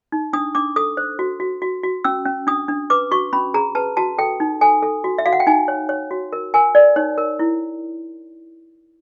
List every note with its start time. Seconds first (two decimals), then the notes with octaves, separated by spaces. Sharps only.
0.12 D#4
0.33 D4 D#6
0.55 D4 D6
0.76 A4 D#6
0.97 C5
1.19 F#4
1.40 F#4
1.62 F#4
1.83 F#4
2.04 C#4 E6
2.25 C#4
2.47 D4 D#6
2.68 D4
2.90 B4 D6
3.11 F#4 C#6
3.33 C#4 B5
3.54 G#4 A#5
3.75 B4 A5
3.97 F#4 A5
4.18 A4 G5
4.40 D#4
4.61 A4 G#5
4.83 A4
5.04 F#4
5.18 E5
5.26 F#4 F5
5.33 F#5
5.40 G5
5.47 D#4 G#5
5.68 C#5
5.89 C#5
6.11 F#4
6.33 A#4
6.54 A#4 G#5
6.75 A#4 D5
6.96 D#4 C#5
7.18 A#4
7.39 E4